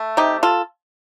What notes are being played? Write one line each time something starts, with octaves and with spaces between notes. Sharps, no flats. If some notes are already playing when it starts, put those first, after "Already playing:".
Already playing: A3
C3 D#4 G4
F4 A4